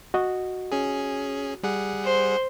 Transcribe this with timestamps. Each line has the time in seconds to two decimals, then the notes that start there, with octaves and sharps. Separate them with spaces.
0.14 F#4 D#5
0.72 C#4 G#4
1.63 G3 G#4 F#5
2.05 C5